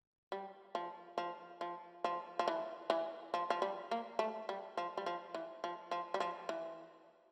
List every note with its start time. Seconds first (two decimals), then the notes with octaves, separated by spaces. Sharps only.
0.32 G3
0.75 F3
1.18 F3
1.61 F3
2.04 F3
2.39 F3
2.48 E3
2.90 E3
3.34 F3
3.50 F3
3.62 G3
3.91 A#3
4.19 A3
4.49 G3
4.77 F3
4.98 G3
5.06 F3
5.35 E3
5.64 F3
5.91 F3
6.14 G3
6.20 F3
6.49 E3